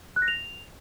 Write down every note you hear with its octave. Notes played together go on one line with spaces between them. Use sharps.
F#6
A#6
F7